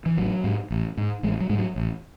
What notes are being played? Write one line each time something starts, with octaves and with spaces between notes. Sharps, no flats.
E3
A1 F#3
G#2
A1
G#2
A1 G#3
F#3
G#2 G#3
F#3
A1